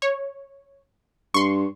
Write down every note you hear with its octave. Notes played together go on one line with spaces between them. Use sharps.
C#5
G2 C6 C#6